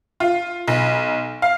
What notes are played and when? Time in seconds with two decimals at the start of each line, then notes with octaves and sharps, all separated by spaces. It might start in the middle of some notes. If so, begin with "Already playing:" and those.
0.20 F4
0.68 B1
1.42 F5